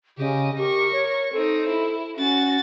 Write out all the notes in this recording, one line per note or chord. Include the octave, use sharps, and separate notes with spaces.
C#3 G4 D#5
G4 A#4 C#6
C#5
C4 D#4 A4
E4
C#4 F#4 A6